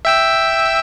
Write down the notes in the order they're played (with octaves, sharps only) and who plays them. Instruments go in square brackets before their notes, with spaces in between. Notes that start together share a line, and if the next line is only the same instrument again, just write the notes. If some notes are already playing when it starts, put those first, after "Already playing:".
[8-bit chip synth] E5 G5 E6